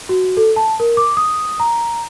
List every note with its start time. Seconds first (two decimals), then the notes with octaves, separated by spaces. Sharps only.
0.09 F#4
0.37 A4
0.56 A5
0.80 A#4
0.97 D6
1.17 D#6
1.60 A#5